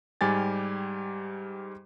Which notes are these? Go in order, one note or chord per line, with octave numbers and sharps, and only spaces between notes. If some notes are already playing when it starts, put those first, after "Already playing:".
G#2 G3 G4 G#5 A6